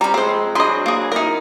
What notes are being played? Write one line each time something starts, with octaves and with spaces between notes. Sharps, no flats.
G3 C4 C#4 A#5 B5
F2 G#3 C4 C5
F#3 C4 D4 G#4 D#5 B5 C6
A#3 G#4
F#2 D#4 E4 A#4